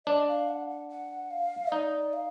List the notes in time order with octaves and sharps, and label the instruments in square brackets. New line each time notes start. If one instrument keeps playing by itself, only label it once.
[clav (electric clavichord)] D4 [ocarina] D#5
[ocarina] F5
F#5
F#5
F#5
F5
[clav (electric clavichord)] D#4 [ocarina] D5
[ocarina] F5